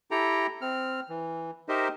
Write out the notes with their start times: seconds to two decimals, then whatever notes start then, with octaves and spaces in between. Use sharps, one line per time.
0.11 E4 G4 A4 G5 A#5
0.62 C4 F6
1.09 E3
1.69 D#4 G4 A#4 C5 D#5 E5